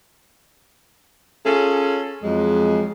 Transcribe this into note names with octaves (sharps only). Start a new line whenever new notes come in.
C#4 F4 G#4 A4
F2 F#3 G#3